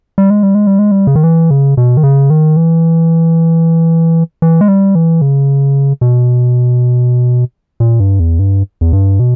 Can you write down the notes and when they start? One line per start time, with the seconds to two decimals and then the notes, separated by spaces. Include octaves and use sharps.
0.18 G3
0.30 G#3
0.43 G3
0.55 G#3
0.67 G3
0.79 G#3
0.91 G3
1.07 C#3
1.15 D#3
1.24 E3
1.51 C#3
1.77 B2
1.97 D#3
2.03 C#3
2.30 D#3
2.57 E3
4.42 E3
4.61 G#3
4.68 G3
4.95 E3
5.22 C#3
6.01 B2
7.80 A#2
8.00 G2
8.20 E2
8.39 G2
8.81 E2
8.93 G2
9.19 B2